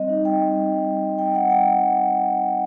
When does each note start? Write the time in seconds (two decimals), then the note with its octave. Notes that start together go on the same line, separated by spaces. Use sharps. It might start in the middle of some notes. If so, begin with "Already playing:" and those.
Already playing: G3 C4 D#5
0.09 D#4
0.25 G3 G5
0.41 C4
0.57 G3
0.73 D#4
0.88 G3
1.04 C4
1.18 G3 G5
1.35 D#4 F#5
1.50 G3 G5